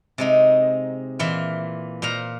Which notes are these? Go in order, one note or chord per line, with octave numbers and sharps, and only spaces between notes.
C3 G#3 D#4
A#2 E3 F4 E5 C6
A#2 C5 F5 A#5